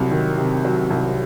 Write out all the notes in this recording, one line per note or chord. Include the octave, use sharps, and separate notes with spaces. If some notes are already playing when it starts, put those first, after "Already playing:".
Already playing: C2 F#3
D#3
C3
F#3
C2